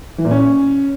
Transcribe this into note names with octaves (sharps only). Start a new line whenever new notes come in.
E3
A#2
C#4